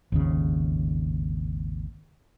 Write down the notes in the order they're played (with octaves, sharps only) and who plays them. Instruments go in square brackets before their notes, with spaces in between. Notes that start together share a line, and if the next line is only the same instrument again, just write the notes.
[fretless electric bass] G#1 D#2 C#3